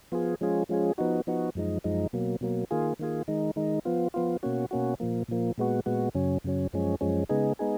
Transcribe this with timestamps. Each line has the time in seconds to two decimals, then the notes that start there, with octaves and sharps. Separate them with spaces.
0.12 F3 B3 F4 G#4
0.41 F3 G#3 C#4 F4 G#4
0.69 F3 G#3 C#4 F4 G#4
0.98 F3 B3 D#4 F#4
1.27 F3 B3 D#4 F#4
1.55 F#2 F3 G#3 D#4
1.84 F#2 F3 G#3 D#4
2.13 B2 F#3 A#3
2.41 B2 F#3 A#3
2.71 D#3 A#3 F4 G#4
2.99 D#3 A#3 F4 G#4
3.28 D#3 G#3 D#4
3.56 D#3 G#3 D#4
3.85 F3 B3 F4
4.14 F3 B3 F4
4.43 B2 A#3 C#4 F#4
4.71 B2 A#3 C#4 F#4
5.00 A#2 F3 A#3
5.28 A#2 F3 A#3
5.58 A#2 G#3 B3 F#4
5.86 A#2 G#3 B3 F#4
6.15 F#2 C#3 F#3 C#4
6.44 F#2 C#3 F#3 C#4
6.73 F#2 F3 G#3 C#4
7.01 F#2 F3 G#3 C#4
7.29 C#3 G#3 B3 D#4 G#4
7.59 G#3 B3 D#4 G#4